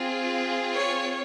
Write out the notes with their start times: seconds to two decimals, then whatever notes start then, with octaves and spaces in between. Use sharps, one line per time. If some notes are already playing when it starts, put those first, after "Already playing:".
Already playing: C4 F4 G#4
0.75 C#5